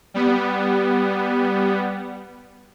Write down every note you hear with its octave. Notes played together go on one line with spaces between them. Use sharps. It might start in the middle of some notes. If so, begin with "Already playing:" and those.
G3 B3